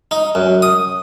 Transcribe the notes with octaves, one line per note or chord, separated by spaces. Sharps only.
D#4
F#2
D#6